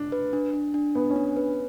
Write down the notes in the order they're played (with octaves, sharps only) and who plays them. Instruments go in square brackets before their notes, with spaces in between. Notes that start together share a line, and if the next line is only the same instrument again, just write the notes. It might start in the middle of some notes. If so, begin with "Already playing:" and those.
Already playing: [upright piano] D4
[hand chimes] B4
D4
D4
D4
[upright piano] B3 [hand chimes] D4
[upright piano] C#4
[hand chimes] D4
B4